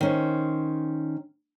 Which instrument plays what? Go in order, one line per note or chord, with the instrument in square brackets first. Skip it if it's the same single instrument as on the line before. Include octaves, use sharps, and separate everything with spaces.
[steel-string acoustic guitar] D#3 C#4 C5